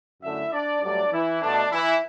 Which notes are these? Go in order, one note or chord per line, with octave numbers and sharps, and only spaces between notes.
F#2 D3 A3 E4 E5
D4 D5
G2 F#3 A3 D4 D5
E3 E4
B2 A3 D4
E3 E4